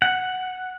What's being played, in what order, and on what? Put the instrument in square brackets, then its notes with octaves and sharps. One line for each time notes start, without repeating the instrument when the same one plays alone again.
[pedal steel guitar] F#5